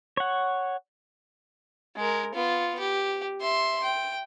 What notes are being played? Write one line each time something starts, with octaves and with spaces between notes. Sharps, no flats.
C#5 F#5
G#3 A#4
B3 F4
G4
E5 C6
G5